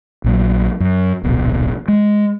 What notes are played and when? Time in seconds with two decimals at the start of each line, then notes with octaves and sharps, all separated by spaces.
0.24 A#1 A#2 F#3
0.80 F#2
1.24 D1 A#1 B2
1.88 G#3